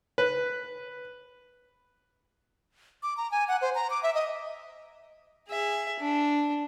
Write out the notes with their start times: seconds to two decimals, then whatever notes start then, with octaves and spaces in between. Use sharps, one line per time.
0.18 B4
3.03 D6
3.17 A#5
3.32 G#5
3.48 F#5
3.62 C5
3.75 A#5
3.90 D6
4.03 E5
4.15 D#5
5.48 G#4 E5
6.00 D4